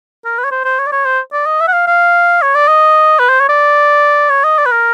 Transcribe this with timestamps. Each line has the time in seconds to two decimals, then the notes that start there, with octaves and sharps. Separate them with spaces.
0.25 A#4
0.38 B4
0.44 C#5
0.51 C5
0.64 C5
0.79 C#5
0.87 D5
0.92 C#5
1.05 C5
1.33 D5
1.46 D#5
1.60 E5
1.67 F#5
1.73 F5
1.87 F5
2.42 C#5
2.55 D5
2.68 D#5
3.19 B4
3.29 C5
3.40 C#5
3.49 D5
4.30 C#5
4.44 D#5
4.58 D5
4.66 B4
4.71 A#4